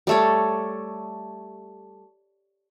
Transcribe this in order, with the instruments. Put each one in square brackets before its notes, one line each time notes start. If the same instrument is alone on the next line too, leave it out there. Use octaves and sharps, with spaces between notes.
[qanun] G3 A3 C#5